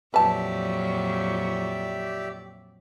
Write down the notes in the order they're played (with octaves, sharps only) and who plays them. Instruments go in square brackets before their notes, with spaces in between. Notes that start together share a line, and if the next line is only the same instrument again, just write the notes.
[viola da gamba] F2 A#2 F#3 [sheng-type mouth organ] G4 D5 E5 [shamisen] B4 A5